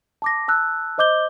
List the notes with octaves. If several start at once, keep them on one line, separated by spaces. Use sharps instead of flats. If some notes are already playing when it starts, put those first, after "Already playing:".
A5 D6 A#6
A5 E6 F#6
C5 D#5 D6 G6 G7